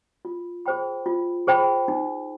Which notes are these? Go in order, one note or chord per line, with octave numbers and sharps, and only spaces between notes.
F4
G#4 C5 G5 B5
F4
G#4 C5 G5 B5
D#4